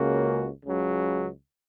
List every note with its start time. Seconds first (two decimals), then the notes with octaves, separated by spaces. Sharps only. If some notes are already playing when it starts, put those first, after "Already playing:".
Already playing: C#2 C#3 A#3 C#4 F#4
0.63 C#2 C#3 F#3